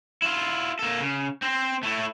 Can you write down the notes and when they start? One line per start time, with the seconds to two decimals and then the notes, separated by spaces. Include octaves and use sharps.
0.22 E4 F4
0.79 A#3 A4
1.00 C#3
1.42 C4 C5
1.83 A3 E4